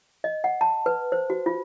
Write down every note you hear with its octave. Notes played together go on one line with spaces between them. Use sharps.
D#5
F#5
A5
B4
C5
F#4
F4